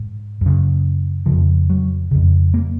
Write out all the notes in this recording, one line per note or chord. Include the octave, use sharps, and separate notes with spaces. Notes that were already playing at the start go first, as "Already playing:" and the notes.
Already playing: G#2
F#2 C#3
F2 C#3 F3
F#3
F2 C#3
A#3